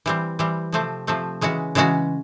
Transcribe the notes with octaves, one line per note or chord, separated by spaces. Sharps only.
E3 G3 C4
E3 G3 C4
C3 F3 A3 C4
C3 F3 A3 C4
C#3 E3 G#3 C#4 F#4
C#3 E3 G#3 C#4 F#4